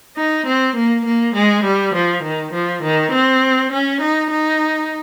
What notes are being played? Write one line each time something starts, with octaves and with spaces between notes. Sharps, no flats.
D#4
C4
A#3
A#3
G#3
G3
F3
D#3
F3
D#3
C4
C#4
D#4
D#4